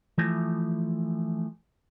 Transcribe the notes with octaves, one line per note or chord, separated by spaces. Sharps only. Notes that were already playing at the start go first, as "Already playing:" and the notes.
E3 F3 A3